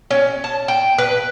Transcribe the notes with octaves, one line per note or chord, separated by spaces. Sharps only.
C#4
A5
G5
B4